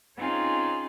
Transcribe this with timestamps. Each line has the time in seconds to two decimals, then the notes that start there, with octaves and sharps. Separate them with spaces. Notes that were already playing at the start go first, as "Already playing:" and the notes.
0.16 C4 C#4 D#4 F4 G#4